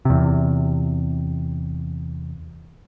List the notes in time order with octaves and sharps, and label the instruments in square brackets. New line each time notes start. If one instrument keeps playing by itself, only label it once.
[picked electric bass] E2 C3